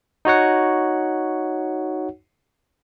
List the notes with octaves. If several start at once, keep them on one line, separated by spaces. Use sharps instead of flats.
D#4 F#4 C#5 F#5